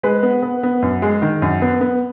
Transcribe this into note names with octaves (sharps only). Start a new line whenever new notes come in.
G#3 B4
B3
B3
B3
F#2
G#3
D#3
F#2
B3
B3